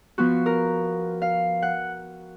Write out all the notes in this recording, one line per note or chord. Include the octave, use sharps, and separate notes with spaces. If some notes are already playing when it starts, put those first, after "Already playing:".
F3 B3 F4 F#4
A#4
F5
F#5